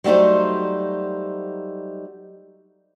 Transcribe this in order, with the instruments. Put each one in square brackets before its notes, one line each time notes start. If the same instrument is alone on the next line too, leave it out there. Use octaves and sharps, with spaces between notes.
[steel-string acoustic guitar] F#3 G3 A3 D#4 C5